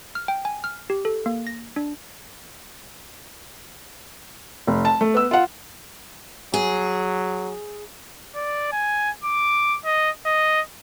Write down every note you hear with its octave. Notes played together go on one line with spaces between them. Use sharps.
F6
G5
G#5
F6
G4
A4
A#3
A#6
D4
F1
A5
A3
B3 E6
F4 F#5
F#3 G#4
D5
G#5
D6
D#5
D#5